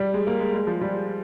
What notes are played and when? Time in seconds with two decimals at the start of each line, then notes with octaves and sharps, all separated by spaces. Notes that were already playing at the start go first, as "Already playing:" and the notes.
Already playing: G3
0.14 G#3
0.27 A#3
0.40 G#3
0.54 G#3
0.67 F3
0.81 G3